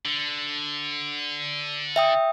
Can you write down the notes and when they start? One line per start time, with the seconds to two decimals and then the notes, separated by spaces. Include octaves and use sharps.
0.05 D3
1.96 E5 G5 D#6